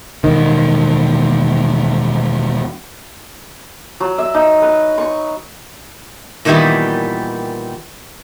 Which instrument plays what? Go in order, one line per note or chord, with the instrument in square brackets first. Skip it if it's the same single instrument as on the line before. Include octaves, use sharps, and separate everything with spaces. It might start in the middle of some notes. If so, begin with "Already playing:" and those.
[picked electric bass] E1 D#3
[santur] F#3
E5
D#4
B4
C#6
[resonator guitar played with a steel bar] A#2 D#3 E3 F#3 G3 B3